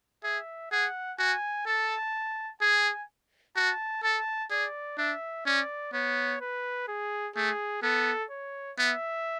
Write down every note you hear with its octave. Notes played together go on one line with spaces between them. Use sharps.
G#4 E5
G#4 F#5
F#4 G#5
A4 A5
G#4 G#5
F#4 A5
A4 A5
G#4 D5
D4 E5
C#4 D5
B3 C#5
B4
G#4
A3 G#4
B3 A4
C#5
B3 E5